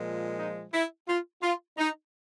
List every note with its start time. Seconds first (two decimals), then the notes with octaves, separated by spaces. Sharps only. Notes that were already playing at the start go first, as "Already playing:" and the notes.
Already playing: A#2 F3 G#3
0.38 D#4
0.74 E4
1.08 F4
1.43 F4
1.78 D#4